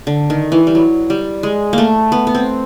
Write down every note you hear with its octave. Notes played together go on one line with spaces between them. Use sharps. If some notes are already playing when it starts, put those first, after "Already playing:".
D3
D#3
E3
G3
F#3
G3
G#3
A3 A#3
B3
B3
C4